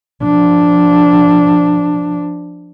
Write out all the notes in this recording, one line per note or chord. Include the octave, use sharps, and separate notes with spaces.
F3 D4